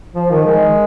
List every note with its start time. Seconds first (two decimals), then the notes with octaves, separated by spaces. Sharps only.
0.15 F3
0.31 D#3
0.46 G#3